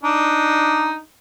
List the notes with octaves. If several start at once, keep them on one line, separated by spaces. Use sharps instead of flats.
D4 D#4